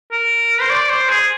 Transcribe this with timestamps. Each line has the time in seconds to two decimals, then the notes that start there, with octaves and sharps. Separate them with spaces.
0.12 A#4
0.61 C5
0.70 D5
0.89 C5
1.09 G#4